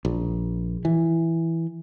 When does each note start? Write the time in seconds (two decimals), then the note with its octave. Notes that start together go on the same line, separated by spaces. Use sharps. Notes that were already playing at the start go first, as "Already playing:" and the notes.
0.05 A#1
0.85 E3